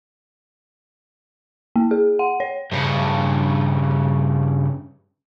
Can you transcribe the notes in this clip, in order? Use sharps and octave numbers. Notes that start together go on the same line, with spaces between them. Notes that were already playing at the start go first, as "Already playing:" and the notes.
A#3
G#4
F#5
C#5
G2 C#3